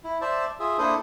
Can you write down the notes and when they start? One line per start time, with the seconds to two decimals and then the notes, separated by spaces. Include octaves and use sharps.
0.04 E4
0.21 C5 D5 E5 A5
0.60 F4 G#4 E5
0.78 A#3 D4 E4 A4 C5 D#6